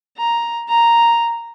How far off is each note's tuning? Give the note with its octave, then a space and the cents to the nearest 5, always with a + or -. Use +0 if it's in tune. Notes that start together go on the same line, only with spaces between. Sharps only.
A#5 +5
A#5 +0